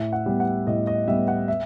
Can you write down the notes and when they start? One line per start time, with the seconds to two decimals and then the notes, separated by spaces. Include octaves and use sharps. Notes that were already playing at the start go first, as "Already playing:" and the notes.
Already playing: A2 E5
0.13 F#5
0.26 G3 B3
0.40 F#5
0.67 A2 D#5
0.87 D#5
1.08 G3 B3 E5
1.28 F#5
1.48 E5